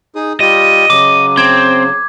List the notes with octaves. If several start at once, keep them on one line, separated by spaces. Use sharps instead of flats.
D#4 G#4 D#6
G3 F4 G4 D#5
C#3 F#3 D6
C4 G#6